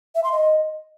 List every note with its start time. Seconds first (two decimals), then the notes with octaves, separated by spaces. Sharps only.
0.15 E5
0.24 C6
0.32 D#5